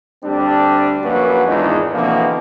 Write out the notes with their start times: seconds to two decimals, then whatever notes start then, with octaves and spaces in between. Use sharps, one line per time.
0.24 D2 G3 C4 D4
1.03 A#1 F#2 A#3 F#4 B4
1.47 G#1 E2 G#2 D4 D#4 F4
1.93 B2 D3 E3 F3 A#3 C4